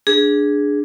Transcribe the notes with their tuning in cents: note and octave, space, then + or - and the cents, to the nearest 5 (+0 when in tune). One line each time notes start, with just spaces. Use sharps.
D4 +0 G#4 +0